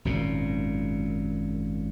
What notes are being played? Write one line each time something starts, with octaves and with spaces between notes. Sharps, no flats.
G#1 F#2 A#2